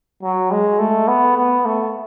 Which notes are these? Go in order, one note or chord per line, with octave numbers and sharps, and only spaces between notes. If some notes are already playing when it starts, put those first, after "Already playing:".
F#3
G#3
A3
B3
B3
A3